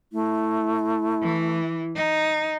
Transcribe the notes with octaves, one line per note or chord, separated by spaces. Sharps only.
A3 E4
E3
D#4